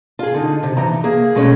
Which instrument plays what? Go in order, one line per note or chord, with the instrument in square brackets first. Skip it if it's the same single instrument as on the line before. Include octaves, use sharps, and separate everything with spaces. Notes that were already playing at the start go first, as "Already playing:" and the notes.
[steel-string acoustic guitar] F4 G#4
D3 D#4
C3
E3 D#4 A#5
A#3 G#4
B2 G#3 A3 B3 C#4